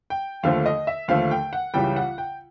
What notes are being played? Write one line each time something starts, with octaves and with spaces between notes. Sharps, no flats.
G5
D#2 D3 F3 A3 F5
D#5
E5
D#2 D3 F3 A3 F5
G5
F#5
C#2 C#3 E3 G3 G5
F#5
G5